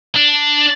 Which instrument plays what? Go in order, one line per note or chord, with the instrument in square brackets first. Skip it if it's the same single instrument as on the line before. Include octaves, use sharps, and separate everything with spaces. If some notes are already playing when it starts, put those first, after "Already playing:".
[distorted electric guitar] D4